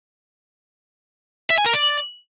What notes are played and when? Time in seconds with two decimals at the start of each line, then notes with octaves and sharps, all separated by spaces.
1.50 E5
1.58 G#5
1.66 A#4
1.73 D5